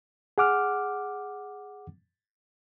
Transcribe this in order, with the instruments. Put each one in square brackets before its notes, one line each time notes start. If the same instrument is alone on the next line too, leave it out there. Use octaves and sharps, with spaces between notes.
[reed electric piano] G#4 F#5 D6 F6